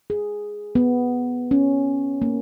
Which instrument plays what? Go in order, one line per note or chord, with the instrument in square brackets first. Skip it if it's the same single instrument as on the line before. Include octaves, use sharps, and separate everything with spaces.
[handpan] G#4
B3
C#4
A#3